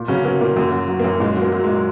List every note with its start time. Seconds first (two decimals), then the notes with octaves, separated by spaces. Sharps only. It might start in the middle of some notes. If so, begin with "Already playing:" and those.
Already playing: A#2
0.08 C#3 F#3 C#4
0.25 F#3 A#3
0.41 A#2 A#3
0.57 F#2
0.72 F#3
0.88 F#3
0.99 A#3
1.04 F#2
1.20 A#2 G#3
1.37 F#3 A#3
1.52 F#3
1.64 G#3
1.68 A#2